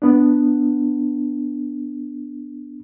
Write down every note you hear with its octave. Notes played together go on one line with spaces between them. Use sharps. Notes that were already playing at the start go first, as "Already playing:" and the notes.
B3 D4